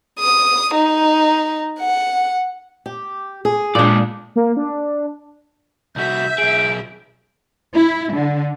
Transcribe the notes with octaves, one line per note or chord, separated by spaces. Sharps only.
D#6
D#4
F#5
G4
G#4
A#2 G#3 D4 D5
A#3
D4
C2 F#4 E5 G6
B1 G#4 D7
E4
D3